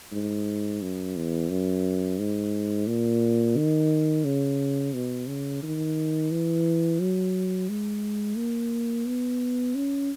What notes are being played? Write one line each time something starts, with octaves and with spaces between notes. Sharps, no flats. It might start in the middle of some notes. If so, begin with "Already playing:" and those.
G#2
F#2
E2
F#2
G#2
A#2
D#3
C#3
B2
C#3
D#3
E3
F#3
G#3
A#3
B3
C#4